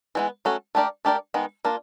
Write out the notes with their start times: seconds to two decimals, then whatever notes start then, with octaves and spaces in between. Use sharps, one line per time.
0.15 E3 G#3 B3
0.45 F#3 A3 C#4 F#4 A4
0.75 A3 D4 G4 A#4 D5
1.05 A3 D4 G4 A#4 D5
1.34 D#3 G#3 B3
1.65 A#3 D4 F4